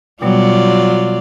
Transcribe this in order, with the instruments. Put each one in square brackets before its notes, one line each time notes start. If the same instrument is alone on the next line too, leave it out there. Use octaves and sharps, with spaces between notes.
[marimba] B2 G3 B3 [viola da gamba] F#3 F4 D5